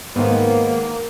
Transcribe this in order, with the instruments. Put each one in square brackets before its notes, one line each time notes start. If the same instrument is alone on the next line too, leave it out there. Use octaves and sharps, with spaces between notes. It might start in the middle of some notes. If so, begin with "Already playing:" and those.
[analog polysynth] G#2 D#3 [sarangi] A#3 [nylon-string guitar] B3 G5 [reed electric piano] B4 C5 F5